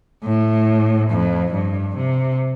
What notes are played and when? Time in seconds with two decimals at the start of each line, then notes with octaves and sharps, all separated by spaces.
0.24 A2
1.10 F2
1.53 G2
1.96 C3